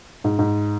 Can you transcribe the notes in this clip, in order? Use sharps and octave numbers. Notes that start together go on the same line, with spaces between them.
G#2
G#2